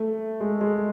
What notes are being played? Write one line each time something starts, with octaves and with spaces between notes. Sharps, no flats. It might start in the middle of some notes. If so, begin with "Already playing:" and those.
Already playing: A3
G#3
G#3